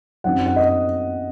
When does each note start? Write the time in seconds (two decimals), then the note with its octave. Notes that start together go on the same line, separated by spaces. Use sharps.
0.24 F#2 F#3 C4 D#4 F#5
0.46 F#5
0.56 D#5